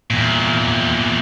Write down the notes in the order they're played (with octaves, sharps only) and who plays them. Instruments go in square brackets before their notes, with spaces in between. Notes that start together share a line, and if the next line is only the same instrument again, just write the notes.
[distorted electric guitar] E2 A#2